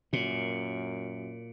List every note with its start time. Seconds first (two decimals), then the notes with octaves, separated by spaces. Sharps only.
0.13 F#2 A#2